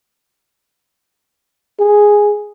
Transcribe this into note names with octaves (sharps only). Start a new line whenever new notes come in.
G#4